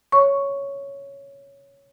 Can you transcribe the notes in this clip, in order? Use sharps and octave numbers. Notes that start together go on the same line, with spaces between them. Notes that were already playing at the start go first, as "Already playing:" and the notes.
C#5 C#6